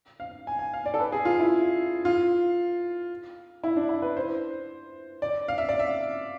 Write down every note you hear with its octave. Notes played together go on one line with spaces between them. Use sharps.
F5
G#5
G#5
F5
D5
A4
B4
G#4
F4
E4
F4
E4
D4
E4
B4
C5
D5
F5
E5
D5
E5